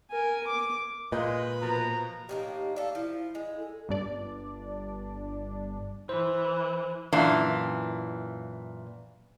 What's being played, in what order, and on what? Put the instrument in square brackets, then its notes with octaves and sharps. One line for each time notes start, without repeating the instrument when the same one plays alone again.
[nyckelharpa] A#4 G#5
D6
[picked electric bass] A#2 [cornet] G#3 [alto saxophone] B4 [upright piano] D#5 F5 G6
[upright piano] B2 F3 A#4 [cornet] A#5
[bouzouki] A2 D#3 A#3 [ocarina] G4
[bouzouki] D4 A4 [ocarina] F5
[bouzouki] F3 [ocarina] E4
[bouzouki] G#3
[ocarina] A4
[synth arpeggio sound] G1 G2 D4 D5
[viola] E3 [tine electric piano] C5
[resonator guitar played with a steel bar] F#2 A#2 E3 D4